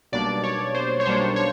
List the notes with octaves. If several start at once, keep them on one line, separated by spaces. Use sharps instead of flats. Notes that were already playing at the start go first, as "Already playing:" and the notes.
B1 B2 G3 A#3 D4 D5
C#5
C5
C#5
B1 B2 G3 A#3 D4 C5
C#5